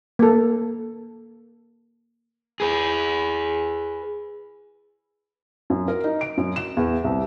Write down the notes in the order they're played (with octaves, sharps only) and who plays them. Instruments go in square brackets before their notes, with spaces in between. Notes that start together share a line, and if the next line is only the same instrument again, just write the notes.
[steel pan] A#3 A4
[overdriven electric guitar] G#4 B4
[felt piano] F#2
A#4
D#4
D7
F#2
E7
E2
C2